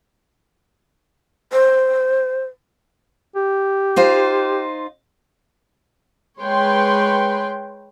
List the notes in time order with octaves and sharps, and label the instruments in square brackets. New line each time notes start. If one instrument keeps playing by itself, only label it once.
[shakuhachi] C5
[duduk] G4
[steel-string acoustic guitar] D#4 F4 C5
[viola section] G#3 B4 C#5 G5 C6